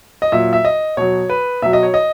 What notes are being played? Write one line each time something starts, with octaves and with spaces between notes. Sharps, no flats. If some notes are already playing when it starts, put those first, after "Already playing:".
D#5
A#2 F#3 E5
E5
D#5
B2 F#3 C#5
B4
B2 F#3 E5
D#5
C#5
D#5